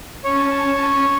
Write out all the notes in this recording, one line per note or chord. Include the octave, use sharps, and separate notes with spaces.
C#4 C#5 A5